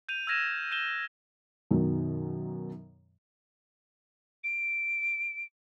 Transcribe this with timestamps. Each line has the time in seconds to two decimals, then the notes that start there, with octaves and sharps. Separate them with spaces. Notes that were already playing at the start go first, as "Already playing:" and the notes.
0.09 G6 D#7 F7
0.27 E6 F6 G#6 A#6 D#7 E7
0.72 G6 D#7 E7 G7
1.71 F#2 B2 D#3 F#3
4.43 D7